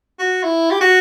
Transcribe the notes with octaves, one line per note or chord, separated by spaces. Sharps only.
F#4
E4
G4
F#4